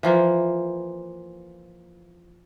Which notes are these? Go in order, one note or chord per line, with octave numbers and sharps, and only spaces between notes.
E3 F3 A#3